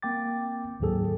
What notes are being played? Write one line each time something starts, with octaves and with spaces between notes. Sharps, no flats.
A#3 C4 G5 D6 A6
D2 G#2 D#3 F#3 G#4 A4